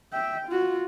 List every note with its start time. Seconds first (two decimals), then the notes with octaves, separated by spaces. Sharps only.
0.13 E5 G5
0.48 F4 F#4